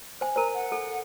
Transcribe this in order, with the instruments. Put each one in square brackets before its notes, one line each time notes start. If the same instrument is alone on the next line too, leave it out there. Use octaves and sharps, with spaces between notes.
[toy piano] C5 G#5
[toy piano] A#4 C5 [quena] A#5
[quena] F#5
[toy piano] A4